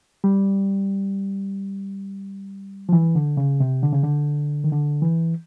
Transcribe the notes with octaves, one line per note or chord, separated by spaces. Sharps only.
G3
F3
E3
D3
C#3
C3
D3
C#3
D3
D#3
D3
E3